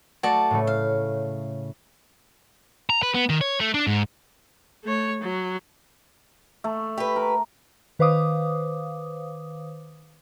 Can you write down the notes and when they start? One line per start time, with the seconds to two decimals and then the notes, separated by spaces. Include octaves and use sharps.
0.23 A3 F#4 D5 A5
0.51 A2 C#3 A3
0.67 F5
2.90 A#5
3.03 B4
3.14 B3
3.30 D#3
3.41 C#5
3.60 A3
3.74 D4
3.87 G#2
4.84 A3 C#5
5.21 F#3
6.64 A3
6.98 G4 B4
7.16 A#4
7.99 D#3 B4 C5 F5 D6 D#6